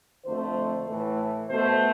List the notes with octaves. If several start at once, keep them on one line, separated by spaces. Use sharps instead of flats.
F2 D3 A3 C5
A2 E3 A3
B2 A3 C5